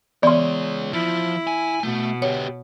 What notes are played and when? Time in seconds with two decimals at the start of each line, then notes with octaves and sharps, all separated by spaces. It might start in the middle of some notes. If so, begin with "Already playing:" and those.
0.23 E3 G#3 B3 C#5 D5 C6
0.93 F3 E4
1.47 G#5
1.83 B2 A3
2.22 B3 G4 C#5